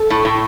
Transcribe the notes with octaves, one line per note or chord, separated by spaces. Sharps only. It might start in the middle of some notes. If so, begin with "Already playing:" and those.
Already playing: A4
A2
A2